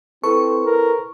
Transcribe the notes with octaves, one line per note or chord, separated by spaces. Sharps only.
C4 E4 A4 B4 C5 C#6
A#4